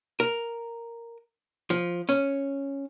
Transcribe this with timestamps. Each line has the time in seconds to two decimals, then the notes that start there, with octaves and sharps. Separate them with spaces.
0.20 A#4
1.70 F3
2.09 C#4